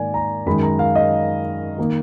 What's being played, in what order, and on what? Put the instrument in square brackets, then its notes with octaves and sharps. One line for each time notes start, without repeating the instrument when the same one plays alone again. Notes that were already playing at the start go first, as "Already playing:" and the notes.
Already playing: [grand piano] G#2 D#3 A#3 D5 G#5
A#5
F#2 D#3 G#3 B5
A#5
F5
D#5
D#3 A#3